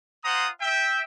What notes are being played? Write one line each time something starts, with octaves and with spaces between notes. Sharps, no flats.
F4 C5 F#5 A#5 D#6
E5 G5